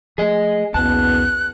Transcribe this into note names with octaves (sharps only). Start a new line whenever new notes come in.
F3 A3 G#4 D#5
F#1 B1 E2 B3 A5 F#6